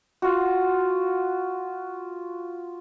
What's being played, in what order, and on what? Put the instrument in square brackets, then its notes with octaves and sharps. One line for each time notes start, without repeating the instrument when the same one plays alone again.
[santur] F4 F#4